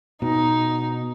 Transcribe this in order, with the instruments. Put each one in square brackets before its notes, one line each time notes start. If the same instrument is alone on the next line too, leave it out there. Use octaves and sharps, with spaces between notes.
[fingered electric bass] B2 [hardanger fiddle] D#4